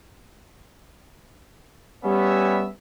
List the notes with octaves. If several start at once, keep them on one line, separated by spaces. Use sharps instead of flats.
G3 B3 C#4 E5